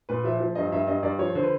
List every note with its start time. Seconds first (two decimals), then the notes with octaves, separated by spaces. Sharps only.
0.09 A#2 B4
0.24 F3 E5
0.40 F3
0.55 G2 D#5
0.72 G2 E5
0.87 G2 D#5
1.03 G2 D5
1.18 F3 C#5
1.35 D3 C5
1.43 B4